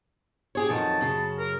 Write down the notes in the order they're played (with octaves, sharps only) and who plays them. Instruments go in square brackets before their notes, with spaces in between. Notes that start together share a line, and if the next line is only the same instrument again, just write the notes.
[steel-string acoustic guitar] G4 G#4 C#5
[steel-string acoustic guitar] F2 D#3 F#3 [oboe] A5
[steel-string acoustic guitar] F#2 C#3
[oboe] A#4